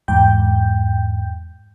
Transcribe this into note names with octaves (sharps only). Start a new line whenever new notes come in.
E2 G#2 G5 G6